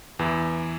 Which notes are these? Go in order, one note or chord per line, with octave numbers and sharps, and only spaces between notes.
E2 E3